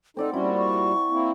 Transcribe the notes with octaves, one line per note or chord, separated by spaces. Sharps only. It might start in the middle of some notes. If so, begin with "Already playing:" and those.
C4 D#4 A4 D5 F#5
A#2 G3 C#4 E4 F#4 C6
C#6
A#3 C4 E4